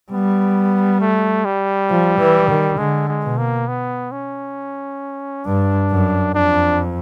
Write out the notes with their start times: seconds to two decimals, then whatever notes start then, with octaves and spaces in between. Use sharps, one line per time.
0.12 G3 B3
1.01 A3
1.45 G3
1.90 F3
2.19 E3
2.49 D#3
2.78 D3 G#3
3.08 G#3
3.23 B2
3.38 A#3
3.68 B3
4.12 C#4
5.46 G2 D4
5.90 F#2
6.35 F2 D4